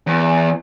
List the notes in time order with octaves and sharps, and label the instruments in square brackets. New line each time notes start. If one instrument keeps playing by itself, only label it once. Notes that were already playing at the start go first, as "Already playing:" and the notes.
[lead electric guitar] E2